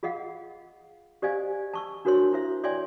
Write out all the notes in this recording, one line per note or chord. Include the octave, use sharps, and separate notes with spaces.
F4 G#4 D#5 F5 F#5
G4 C5 D5 D#5 F5 G#5
A5 C#6 E6
D4 F#4 A#4 C5 C#5 C6
E4 C5 E5
C#5 D5 E5 G5 G#5 C6